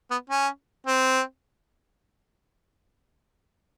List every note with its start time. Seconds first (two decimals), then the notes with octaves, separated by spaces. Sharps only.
0.11 B3
0.30 C#4
0.86 C4